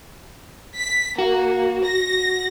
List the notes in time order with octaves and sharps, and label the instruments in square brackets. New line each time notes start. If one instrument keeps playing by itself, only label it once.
[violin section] B6
[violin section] A#3 [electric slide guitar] F#4
[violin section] A#6